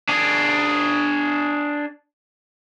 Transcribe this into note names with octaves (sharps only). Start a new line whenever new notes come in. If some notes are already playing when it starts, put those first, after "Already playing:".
D4 G#4